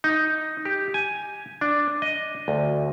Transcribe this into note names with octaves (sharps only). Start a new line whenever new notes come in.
D#4
G4
G#5
D4
D#5
D2